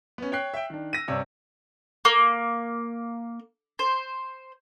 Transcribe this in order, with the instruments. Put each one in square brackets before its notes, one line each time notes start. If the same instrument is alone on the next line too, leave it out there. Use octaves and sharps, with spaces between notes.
[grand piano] B3 C#4
C#5 G5 F#6 C7
E5 G5
D#3 D4
E6 A#6 D#7
G2 C3 D4 C#5 E6
[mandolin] A#3
C5